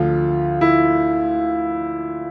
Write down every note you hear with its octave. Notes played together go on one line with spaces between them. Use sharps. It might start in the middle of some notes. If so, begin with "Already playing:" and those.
Already playing: D2 D3 F3 F4
E4